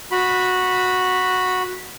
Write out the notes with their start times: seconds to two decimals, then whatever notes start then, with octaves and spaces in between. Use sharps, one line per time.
0.12 F#4 B5